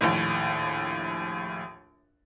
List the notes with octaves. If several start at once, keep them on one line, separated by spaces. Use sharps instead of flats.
A#1 D#2 A2